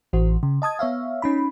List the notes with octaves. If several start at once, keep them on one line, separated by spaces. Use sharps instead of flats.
A1 E3 F#4 C5
C#3
D#5 A5 D#6 G#6
B3 C#5 E5 F5
C#4 D#4 B5